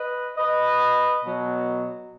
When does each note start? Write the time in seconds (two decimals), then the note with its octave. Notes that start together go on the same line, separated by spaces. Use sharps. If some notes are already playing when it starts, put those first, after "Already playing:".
Already playing: B4 D#5
0.37 B4 D#5
1.24 B2 F#3